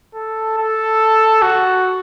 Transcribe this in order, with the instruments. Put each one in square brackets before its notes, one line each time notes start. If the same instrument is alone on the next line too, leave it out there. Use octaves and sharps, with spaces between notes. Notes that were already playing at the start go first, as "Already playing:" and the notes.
[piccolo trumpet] A4
A4
F#4